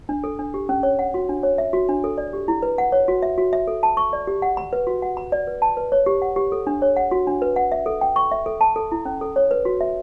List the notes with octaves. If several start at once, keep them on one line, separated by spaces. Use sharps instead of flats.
D4
A4
D4
G4
C#4
C#5
F#5
F#4
D4
C#5
E5
F#4
D4
A4
D5
G4
E4
B4
F#5
C#5
F#4
E5
F#4
E5
A4
A5
C#6
D5
G4
F#5
B5
B4
F#4
F#5
B5
D5
B4
A5
B4
C#5
G4
F#5
G4
A4
D4
C#5
F#5
F#4
D4
B4
F#5
E5
A4
G5
C#6
E5
A4
A5
A4
E4
C#4
A4
C#5
B4
F#4
E5